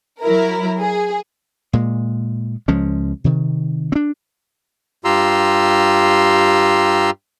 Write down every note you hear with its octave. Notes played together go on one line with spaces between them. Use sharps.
F#3 E4 A#4
G#4
A#2 G#3
C#2 F3 G#3 C#4
C3 D#3
C4 D4
G2 F4 G4 A#5 C6 E6